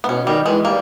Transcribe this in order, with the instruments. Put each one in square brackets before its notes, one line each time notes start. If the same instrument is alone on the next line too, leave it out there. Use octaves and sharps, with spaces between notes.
[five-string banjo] B3
[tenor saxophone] B2 [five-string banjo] C#4
[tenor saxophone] D#3 [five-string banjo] G3
[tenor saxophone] E3 [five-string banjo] G#3
[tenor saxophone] G3 [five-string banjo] A#3